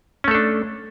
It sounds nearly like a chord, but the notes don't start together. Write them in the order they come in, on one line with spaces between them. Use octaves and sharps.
C#4 A3 A4 D4